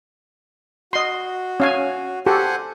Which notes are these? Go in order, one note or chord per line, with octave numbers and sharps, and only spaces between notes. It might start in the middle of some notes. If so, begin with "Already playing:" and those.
F#4 D#5 C6
C#4 F5 G#5
F#4 G4 A4 C5 F#5 G#5